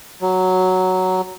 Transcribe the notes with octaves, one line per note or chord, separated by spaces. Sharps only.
F#3